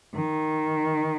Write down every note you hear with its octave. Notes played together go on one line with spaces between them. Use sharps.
D#3